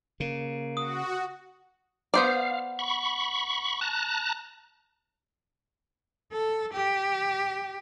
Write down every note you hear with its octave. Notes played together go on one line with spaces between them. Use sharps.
C#3 A#3
F#4 D#6
B3 C5 D5 F5
B5 C#6
A5 A#5 F#6
A4
G4